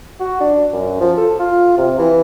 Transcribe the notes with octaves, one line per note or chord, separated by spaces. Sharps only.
F#4
D4
F#2
F3
A4
F4
C3
E3